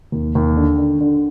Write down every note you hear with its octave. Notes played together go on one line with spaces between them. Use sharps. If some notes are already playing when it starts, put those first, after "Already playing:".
D#2
D#2
D3
D3
D3